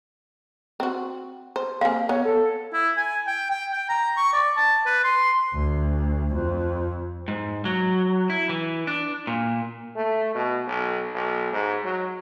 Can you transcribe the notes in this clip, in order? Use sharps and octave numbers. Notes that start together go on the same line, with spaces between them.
C4 F#4
C5
A#3 C4 F5 G#5
B3 C#5
A4
E4
G#5
G5
G5
G5
A#5
C#6
D5
A5
B4
C6
D2
F2
G#2
F#3
E4
E3
D4
A#2
A3
B2
B1
B1
G#2
F#3